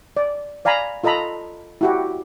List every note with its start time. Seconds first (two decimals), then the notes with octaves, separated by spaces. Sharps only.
0.17 D5
0.65 D5 F5 G#5 A#5 B5
1.04 F4 A4 D#5 A#5 B5
1.81 E4 F#4 G4